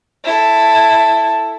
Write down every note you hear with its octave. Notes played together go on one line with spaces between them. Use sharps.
E4 A4